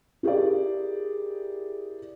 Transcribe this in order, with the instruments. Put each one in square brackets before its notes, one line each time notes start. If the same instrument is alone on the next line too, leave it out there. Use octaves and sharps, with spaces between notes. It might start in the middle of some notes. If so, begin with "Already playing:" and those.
[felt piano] E4 G4 G#4 A#4 D5